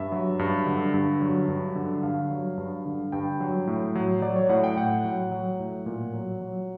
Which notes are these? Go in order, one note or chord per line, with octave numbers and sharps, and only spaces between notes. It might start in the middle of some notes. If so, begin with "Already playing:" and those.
Already playing: G2 E5
F#3
G2
D3
G2
F#3
G2
D3
G2 F5
F#3
G2
D3
G2 G5
F#3
A2
F#3
F#3 D5
C#5
A2 F#5
G5
A2 F#5
F#3
F#3
A2
A#2
F#3
F#3